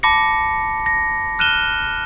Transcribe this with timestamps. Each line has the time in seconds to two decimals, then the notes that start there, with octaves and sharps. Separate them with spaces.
0.03 A5 B5 D6 A#6 C#7
0.86 A#6
1.39 F6 F#6 D#7 E7 G7